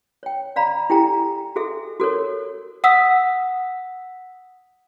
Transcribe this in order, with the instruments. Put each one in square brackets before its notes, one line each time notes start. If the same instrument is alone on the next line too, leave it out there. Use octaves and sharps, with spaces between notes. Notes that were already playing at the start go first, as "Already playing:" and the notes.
[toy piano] C#5 G5
D5 F5 A#5 B5
E4 G4 A4 G5 G#5 A#5
F#4 G#4 A4 E5
F#4 A4 A#4 C#5
[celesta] F#5 D#6 E6 B6